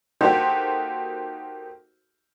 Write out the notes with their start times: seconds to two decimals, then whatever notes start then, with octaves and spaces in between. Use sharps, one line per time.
0.21 A#3 D#4 F#4 G4 A4 C5